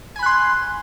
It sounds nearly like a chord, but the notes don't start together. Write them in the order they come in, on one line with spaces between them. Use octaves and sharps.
G#5 B5 F#6 C6